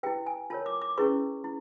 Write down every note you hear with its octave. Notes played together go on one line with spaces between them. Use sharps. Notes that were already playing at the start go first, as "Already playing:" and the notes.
E4 G4 B4 G5
G#5
F4 A#4 C#5 A5
D6
D6
C#4 E4 G#4 B4 C#6
E4